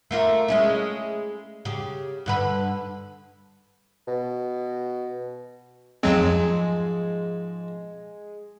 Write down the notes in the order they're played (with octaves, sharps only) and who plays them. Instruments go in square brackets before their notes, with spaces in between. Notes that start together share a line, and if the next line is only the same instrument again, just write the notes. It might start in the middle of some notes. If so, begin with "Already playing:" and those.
[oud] A3 A#3 F4
G#3 C#4 E4
C#3 G4
G2 D3 B4
[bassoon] B2
[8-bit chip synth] F2 F#3 C4 [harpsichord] G#2 F3 [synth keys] G#3